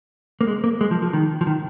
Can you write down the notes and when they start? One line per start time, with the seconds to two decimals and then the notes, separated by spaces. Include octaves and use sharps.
0.41 A#3
0.47 G#3
0.64 A#3
0.81 G#3
0.91 F3
1.02 F3
1.13 D#3
1.41 F3
1.47 D#3